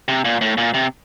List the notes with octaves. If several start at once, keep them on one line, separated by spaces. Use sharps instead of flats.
C3
A#2
A2
A#2
C3